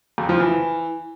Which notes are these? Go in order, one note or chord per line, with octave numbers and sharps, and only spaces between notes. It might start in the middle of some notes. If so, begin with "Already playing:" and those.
F2
F3
E3